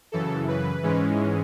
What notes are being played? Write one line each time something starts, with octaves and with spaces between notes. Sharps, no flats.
F#2 C#3 E3 A4
B4
G#2 E3 G#3 C#4